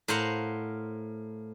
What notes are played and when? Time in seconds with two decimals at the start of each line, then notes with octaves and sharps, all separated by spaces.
0.08 A2 A#4 C5 F5 F#5